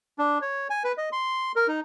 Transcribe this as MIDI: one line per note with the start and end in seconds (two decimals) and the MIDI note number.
0.19 0.38 62
0.42 0.68 73
0.70 0.83 80
0.84 0.92 71
0.98 1.09 75
1.12 1.52 84
1.56 1.67 70
1.68 1.80 63